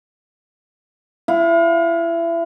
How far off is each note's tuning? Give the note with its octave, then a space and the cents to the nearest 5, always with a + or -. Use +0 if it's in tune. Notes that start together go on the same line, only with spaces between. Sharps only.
E4 +30 F5 +35